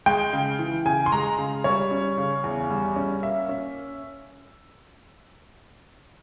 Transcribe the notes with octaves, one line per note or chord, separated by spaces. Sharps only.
G#3 G5
C#3
E3
C#3 G#5
C6
G#3 A#5
C#3
G3 C#5
C#4
C#3
E2
G3
C#4
A#3 E5
C#4